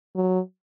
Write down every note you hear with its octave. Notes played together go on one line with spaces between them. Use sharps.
F#3